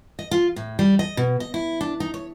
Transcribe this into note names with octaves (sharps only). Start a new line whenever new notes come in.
D#5
F4
A2
G3
D#5
B2
D#5
E4
D4
D#4
C#5